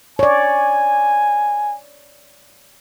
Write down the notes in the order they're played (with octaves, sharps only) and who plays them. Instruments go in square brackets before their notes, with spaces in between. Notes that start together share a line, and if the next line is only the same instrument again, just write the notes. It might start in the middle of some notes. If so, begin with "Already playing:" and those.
[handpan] C#5 D5 [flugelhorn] G#5